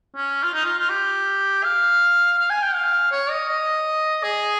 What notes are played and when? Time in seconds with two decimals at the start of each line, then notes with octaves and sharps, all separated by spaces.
0.16 C#4
0.43 F4
0.53 D#4
0.65 F4
0.78 F4
0.90 G4
1.64 F5
2.38 F5
2.50 G#5
2.62 G5
2.75 F5
3.11 C#5
3.31 D#5
3.49 D#5
4.23 G#4